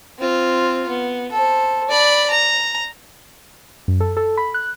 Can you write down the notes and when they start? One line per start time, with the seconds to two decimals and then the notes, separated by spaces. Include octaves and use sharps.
0.18 C4 F4
0.89 B3
1.32 A4 C5
1.89 D5 B5
2.30 A#5
3.88 F#2
4.00 A4
4.17 A4
4.37 B5
4.54 F#6